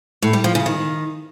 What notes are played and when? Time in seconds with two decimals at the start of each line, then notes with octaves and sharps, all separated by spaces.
0.22 A2
0.33 G3
0.44 F3
0.55 C#3
0.66 D#3